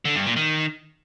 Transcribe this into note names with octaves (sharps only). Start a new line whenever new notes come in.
D3
G2
A#2
D#3